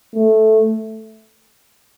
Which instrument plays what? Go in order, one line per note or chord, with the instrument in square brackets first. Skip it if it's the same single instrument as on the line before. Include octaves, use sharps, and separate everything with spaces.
[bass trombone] A3